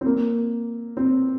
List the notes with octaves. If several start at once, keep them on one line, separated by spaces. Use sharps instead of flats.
C4
A#3
C4